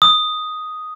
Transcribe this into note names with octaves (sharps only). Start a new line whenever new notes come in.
D#6